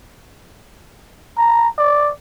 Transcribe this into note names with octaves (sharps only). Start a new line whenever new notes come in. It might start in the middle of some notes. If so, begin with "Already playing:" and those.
A#5
D5